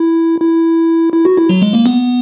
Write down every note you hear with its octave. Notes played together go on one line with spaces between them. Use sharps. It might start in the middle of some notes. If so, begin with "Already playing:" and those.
Already playing: E4
E4
E4
F#4
E4
F#3
G#3
A#3
B3